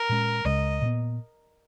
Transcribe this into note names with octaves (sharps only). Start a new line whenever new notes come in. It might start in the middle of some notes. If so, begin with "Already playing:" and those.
Already playing: A#4
A#2 G#3 C#4
C#2 C#3 G#3 D#5
A#2 F#3 B3